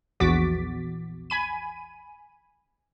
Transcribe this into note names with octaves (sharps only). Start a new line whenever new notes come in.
A#1 E2 F#4 D6 A6 B6
G#5 B5 D#7